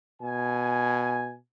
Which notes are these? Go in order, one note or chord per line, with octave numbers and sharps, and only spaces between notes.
B2 G#5